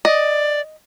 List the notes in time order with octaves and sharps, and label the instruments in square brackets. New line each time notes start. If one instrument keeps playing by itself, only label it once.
[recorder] D5 [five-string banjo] D#5